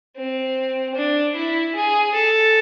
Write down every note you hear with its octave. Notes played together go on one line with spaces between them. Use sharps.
C4
D4
E4
G#4
A4